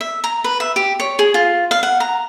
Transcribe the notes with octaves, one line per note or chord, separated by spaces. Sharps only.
E5
A#5
B4
E5
G4
C#5
G#4
F4
F5
F#5
A#5